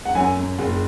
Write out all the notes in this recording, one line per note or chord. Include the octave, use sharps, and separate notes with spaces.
F#5
F#2 G#5
F#2
F#1